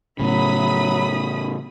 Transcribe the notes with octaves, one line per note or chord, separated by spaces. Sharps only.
A2 C#3 F#3 E5 B5 D#6